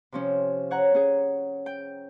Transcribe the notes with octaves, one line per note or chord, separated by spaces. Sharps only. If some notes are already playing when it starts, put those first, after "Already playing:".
C3 F3 C#4
C#5 F#5 A#5
C#4 G#4
G5